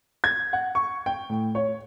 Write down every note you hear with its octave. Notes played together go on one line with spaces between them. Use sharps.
G#6
F#5
C#6
G5
A2
C#5